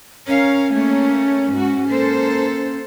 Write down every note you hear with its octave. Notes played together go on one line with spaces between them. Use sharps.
C#4 A#4 C#5 F5
A3 A#3 C#5
G#2 F#4
A#3 A4 C5